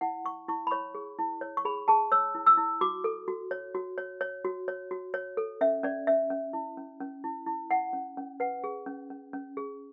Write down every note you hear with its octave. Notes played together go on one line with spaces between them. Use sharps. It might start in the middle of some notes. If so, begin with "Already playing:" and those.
E4 F#5
E4 C#6
E4 C#6
B5
C#5 C#6
G#4
E4
C#5
C#6
G#4 B5
G#4 A5
C#5 E6
E4
E6
E4
F#4 D6
A4
F#4
C#5
F#4
C#5
C#5
F#4
C#5
F#4
C#5
A4
C#4 E5
C#4 D5
C#4 E5
C#4
E4
C#4
C#4
E4
E4
E4 F#5
C#4
C#4
B4 F#5
G#4
C#4
C#4
C#4
G#4